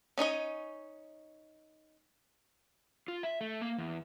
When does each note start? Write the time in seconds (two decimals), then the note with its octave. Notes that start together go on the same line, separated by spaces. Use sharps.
0.18 C#4 D#4 C#5 D#5
3.08 F4
3.23 E5
3.41 A3
3.62 A#3
3.78 E2